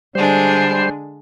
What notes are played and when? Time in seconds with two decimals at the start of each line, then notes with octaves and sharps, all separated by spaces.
0.15 D3 G3 G#3 D4 C5